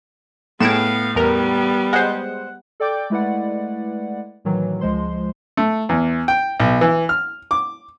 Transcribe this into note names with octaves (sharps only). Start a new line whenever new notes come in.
A2 B3 G#4 F5 D7 E7
E2 G3 B3 A#4
G#3 C5 F#5
A4 D5 G5 D6 G6
G#3 A3 E4 B4 D5 F#5
A2 D#3 E3 F#3
C#2 F3 G#3 C5 C6
A3
E2
G5
B1
E3
F6
D6